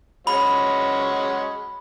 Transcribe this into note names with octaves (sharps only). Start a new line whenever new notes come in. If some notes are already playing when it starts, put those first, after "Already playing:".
G#3 C#4 F#4 B5